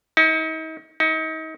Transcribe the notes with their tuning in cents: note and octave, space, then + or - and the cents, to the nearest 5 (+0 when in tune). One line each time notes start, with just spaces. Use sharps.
D#4 +40
D#4 +35